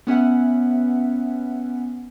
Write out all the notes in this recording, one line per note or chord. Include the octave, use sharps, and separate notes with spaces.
B3 C#4 E5 F#5